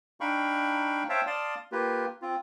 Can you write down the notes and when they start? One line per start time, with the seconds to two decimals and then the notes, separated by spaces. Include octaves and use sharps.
0.20 D4 D#4 F5 G5 B5 C#6
1.09 C5 C#5 E5 F5 G5 A5
1.27 D5 F5 A5 C6 D#6
1.72 A#3 F4 G4 B4
2.22 C4 F4